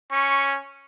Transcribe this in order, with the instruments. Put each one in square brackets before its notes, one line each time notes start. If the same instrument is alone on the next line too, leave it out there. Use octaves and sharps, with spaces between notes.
[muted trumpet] C#4 [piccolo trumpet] C#6